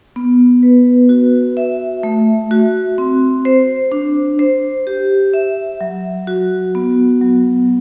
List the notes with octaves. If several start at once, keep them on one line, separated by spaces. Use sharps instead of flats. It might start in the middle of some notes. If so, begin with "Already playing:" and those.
B3
B4
F#4
E5
A3
F#4
C4
C5
D4
C5
G4
E5
F#3
F#4
B3
F#3